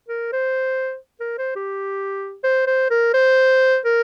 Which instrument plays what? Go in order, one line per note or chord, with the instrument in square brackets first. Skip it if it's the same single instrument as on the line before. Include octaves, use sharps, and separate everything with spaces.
[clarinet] A#4
C5
A#4
C5
G4
C5
C5
A#4
C5
A#4